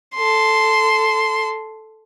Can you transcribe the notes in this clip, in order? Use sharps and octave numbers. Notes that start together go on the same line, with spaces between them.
A4 C6